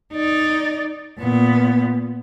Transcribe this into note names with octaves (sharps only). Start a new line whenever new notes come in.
D#4 D5
A#2 B3